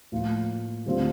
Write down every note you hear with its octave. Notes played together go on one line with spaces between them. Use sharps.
A2 F3 A#3 F4
D2 D3 G3 C4 F4